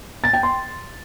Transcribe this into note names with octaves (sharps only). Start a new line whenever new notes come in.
A6
G5
C6